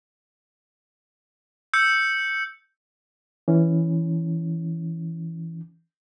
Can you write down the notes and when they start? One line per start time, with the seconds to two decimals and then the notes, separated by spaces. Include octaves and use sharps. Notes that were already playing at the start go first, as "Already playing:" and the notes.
1.74 E6 G6 C#7
3.48 E3 C#4